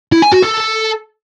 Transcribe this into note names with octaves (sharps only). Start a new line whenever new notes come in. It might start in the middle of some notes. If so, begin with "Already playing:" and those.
E4
G#5
F#4
A4